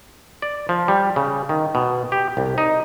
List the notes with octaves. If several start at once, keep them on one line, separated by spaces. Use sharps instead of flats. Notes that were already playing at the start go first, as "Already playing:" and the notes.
D5
F3
G3
C#3
D#3
B2
G4
C2
D#4